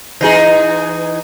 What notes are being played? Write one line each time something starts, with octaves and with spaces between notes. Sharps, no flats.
E3 D#4 G#4